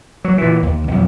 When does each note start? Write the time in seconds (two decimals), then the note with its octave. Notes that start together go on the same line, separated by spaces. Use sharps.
0.24 F#3
0.38 A#2 E3
0.63 D#2
0.88 B1 F2